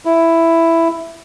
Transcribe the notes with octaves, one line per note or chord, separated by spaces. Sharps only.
E4